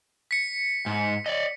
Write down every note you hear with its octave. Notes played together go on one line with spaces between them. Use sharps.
B6 C#7
G#2
D5 D#5